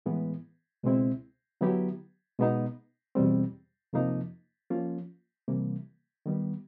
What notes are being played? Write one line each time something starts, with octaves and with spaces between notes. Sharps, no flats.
A2 E3 G#3 B3
C#2 B2 G#3 C4 E4
D3 F#3 B3 E4 G4
B2 G#3 B3 D#4
E2 B2 G3 C4
F2 C3 F3 A#3 D#4
F3 A#3 C#4 F4
C3 E3 G3 A#3
D#3 G3 B3